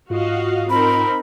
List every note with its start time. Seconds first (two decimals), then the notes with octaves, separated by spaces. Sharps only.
0.10 G#2 F4 F#4 D#5 F5
0.70 C4 D#4 A#4 B5